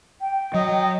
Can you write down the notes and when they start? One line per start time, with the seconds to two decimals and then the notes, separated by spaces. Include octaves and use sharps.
0.21 G5
0.54 F#3 D#5